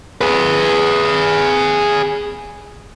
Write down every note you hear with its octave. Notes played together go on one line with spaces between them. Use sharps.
G#4 B4